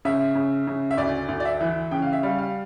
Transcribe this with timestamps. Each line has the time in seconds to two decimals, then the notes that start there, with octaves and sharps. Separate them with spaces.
0.05 C#3 E5
0.35 C#3
0.67 C#3
0.91 E5
0.97 D2 D5
1.29 D2
1.40 D5
1.45 E5
1.61 E3
1.91 C#3 G5
2.02 F5
2.13 E5
2.23 G3 F5
2.38 F5